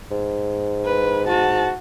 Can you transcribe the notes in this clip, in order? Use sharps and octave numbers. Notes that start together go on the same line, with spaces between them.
G#2
B4
F#4 A5